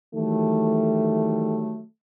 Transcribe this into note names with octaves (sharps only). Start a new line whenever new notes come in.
D#3 E3 F#3 G3 A3